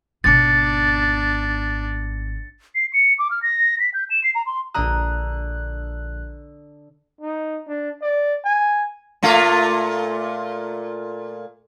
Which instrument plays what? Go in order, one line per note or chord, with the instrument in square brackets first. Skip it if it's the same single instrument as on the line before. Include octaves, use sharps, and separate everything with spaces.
[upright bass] G#1 B2 [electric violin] D4 [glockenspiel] A6 C#7
[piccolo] C7
C#7
D6
F6
A#6
B6
G6
E7
C7
A#5
C6
[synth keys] A#1 F#6 [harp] D3 A#5 D#6
[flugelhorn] D#4
D4
D5
G#5
[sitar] A#2 A3 F4